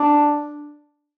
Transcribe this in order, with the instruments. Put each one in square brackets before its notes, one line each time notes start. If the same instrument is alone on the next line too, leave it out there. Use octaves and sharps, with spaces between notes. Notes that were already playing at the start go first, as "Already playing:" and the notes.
Already playing: [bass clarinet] D4